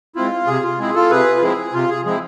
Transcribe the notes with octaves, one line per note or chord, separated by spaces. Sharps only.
G#3 C4 E4 F4
C3 G#4
F4
G#3 C4 E4 G#4
F4 A4
C3 G#4 B4
F4
F3 G#3 C4 E4 G#4
C3 F4
G#4
F3 G#3 C4 E4 G#4